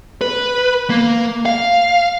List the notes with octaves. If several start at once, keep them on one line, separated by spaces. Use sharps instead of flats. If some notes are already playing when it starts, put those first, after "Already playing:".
B4
A#3
F5